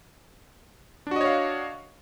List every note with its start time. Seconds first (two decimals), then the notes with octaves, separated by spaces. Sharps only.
1.07 D4
1.11 F#4
1.16 D#5
1.21 C#5
1.25 F5